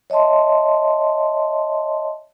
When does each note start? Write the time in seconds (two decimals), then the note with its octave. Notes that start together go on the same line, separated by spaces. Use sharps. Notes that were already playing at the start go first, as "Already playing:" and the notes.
0.10 C#5 D#5 E5 A5 C6